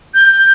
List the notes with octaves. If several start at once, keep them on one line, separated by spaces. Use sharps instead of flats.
G6